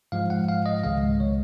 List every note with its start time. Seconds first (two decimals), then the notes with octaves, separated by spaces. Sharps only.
0.12 G#2 F3 G#3 F5
0.30 F#5
0.49 F5
0.66 D#5
0.84 C#2 C3 D#3 G#3 F5
1.01 D#5
1.20 C#5